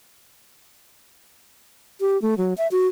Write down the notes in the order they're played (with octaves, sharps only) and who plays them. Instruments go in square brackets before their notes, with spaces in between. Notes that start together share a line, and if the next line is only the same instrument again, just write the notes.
[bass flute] G4
A3
F#3
E5
F#4